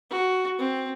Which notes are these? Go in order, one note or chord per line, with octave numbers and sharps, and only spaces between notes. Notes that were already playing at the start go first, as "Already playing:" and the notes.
F#4
C4